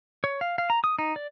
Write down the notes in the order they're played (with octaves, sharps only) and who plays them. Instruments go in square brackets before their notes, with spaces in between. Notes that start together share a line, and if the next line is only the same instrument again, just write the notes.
[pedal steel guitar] C#5
F5
F5
A#5
D#6
D#4
D5